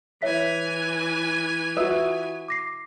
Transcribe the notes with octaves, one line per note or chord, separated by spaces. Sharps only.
E3 C#5 E5 G#5 B6
F4 F#4 B4 E5 D#6
D6 A#6 C7